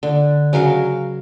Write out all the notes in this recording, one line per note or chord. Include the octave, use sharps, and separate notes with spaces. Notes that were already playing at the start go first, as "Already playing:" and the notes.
D3
C#3 F#3 A#4 F5